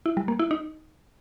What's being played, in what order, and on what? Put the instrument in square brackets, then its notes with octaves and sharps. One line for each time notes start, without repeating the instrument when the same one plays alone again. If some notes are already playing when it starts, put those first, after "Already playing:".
[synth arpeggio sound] E4
G3
A#3
E4
D#4